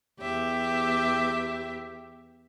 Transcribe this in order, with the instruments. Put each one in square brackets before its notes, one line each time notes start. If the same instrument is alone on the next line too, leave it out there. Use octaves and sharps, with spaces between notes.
[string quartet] E2 G4 E5